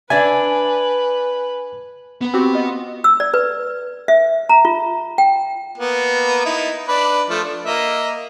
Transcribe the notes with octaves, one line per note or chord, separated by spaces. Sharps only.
D4 B4 D5 E5 G#5
B3 B4
C4 F#4 G4
F4 D#5 F#5
E6
D5
B4
E5
A#5
F4
G5
A#3 B3
D#4 E4
D4 B4 D5
F3 A3
D4
A#3 D#5 E5